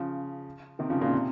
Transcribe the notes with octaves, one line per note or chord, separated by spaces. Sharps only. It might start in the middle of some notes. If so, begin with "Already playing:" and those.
Already playing: C#3 F3
C3 D#3
C#3 F3
A#2 C#3
C3